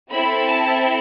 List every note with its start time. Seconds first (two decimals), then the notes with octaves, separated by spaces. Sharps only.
0.10 C4 E4 A4 B5
0.45 A5